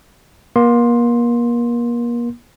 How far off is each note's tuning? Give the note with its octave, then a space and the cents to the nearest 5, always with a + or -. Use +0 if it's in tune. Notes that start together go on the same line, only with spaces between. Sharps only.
A#3 +35 C6 +10